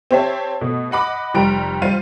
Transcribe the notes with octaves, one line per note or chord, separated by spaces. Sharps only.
C4 G4 C5 C#5 E5 A5
B2 A3
D#5 F#5 B5 D6
F1 G3 G4 A#5 D7
G3 F4 C5 F5 D#7